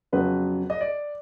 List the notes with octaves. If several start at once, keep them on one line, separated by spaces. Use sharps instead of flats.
F2 C#3 F#3 B3 B4
D#5
D5